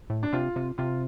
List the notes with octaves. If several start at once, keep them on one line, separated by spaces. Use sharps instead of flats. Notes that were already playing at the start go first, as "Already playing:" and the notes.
A2
D4
C3 F4
C3
C3 F4